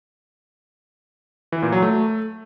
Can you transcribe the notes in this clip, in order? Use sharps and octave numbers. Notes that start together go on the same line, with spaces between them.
E3
A#2
F#3
A3